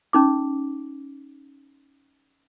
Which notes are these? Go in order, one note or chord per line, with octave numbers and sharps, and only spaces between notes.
C#4 D#4 D6